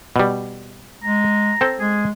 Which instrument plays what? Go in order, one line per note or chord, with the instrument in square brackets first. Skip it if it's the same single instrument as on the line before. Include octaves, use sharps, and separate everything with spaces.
[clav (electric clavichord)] B2 G3
[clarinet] G#3 [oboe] A#5
[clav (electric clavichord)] C4 A4 C5
[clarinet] G#3 [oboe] G#4